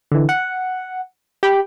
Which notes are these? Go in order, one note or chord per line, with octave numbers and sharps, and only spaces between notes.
D3 E3
F#5
G4 G5 B5